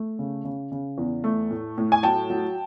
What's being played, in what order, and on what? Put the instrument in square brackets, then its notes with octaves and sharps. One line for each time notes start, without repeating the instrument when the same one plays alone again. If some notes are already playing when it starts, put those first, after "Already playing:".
Already playing: [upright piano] A3
C#3
C#3
C#3
E2
A3
A2
A2
G#5
F#3 G5 A5
F#3